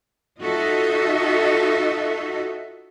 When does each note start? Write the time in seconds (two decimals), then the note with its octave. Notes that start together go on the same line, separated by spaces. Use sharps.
0.41 D#4 F4 F#4 A4 D#5 E5